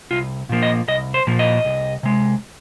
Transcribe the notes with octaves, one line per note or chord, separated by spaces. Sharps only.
C2 F4
A#2 F3 A#3
D#5
C2 D#5
C5
A#2 F3 A#3
D#5
C2
C3 G#3